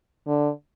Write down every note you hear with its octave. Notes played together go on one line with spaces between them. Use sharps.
D3